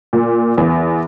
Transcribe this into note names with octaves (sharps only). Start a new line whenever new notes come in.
A#2
E2